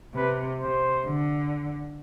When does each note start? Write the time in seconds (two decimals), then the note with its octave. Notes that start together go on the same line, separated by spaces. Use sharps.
0.15 C3 B4
0.61 C3 C5
1.06 D3